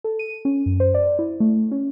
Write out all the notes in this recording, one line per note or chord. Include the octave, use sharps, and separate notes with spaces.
A4
D#7
C#4
F#2
C5
D5
E4
A3
C#4